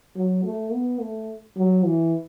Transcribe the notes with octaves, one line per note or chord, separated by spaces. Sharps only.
F#3
A3
B3
A3
F#3
E3